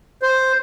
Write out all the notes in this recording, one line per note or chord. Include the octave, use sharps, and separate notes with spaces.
C5